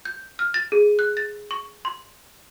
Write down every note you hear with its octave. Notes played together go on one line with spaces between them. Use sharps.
G6
F6
A6
G#4
F#6
A6
C#6
C6